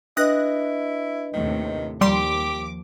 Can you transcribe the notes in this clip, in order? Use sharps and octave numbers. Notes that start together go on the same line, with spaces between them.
D4 E4 B4 D#5 D#6 F#6 A#6
D#2 A2 C3 D#3
D#2 F3 G3 G4 C6 D6